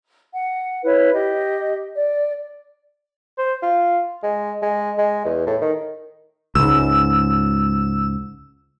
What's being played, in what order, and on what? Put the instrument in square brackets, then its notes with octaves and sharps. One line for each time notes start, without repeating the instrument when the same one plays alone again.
[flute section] F#5
E4 B4 C#5
G4 D#5
D5
[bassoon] C5
F4
G#3
G#3
G#3
E2
A2
D#3
[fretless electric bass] C#2 G#2 [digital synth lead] E6